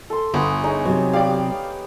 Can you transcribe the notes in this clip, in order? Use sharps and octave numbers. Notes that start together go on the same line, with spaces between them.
A4 C6
G1 B3 G#5 C6
D#4 G#4 C#5
C3 F#3
G4 D5 F5